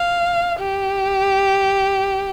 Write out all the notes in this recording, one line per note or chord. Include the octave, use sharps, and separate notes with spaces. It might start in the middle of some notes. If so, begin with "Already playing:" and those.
Already playing: F5
G4